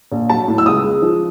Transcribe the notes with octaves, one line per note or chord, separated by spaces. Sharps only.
A#1
F#3 A5
A2
E6
C#2 D#6
G#3
F3